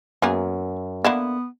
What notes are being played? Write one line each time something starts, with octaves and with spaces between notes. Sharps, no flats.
F#2 A#3 B3 G#4
D3 A#3 B3 E4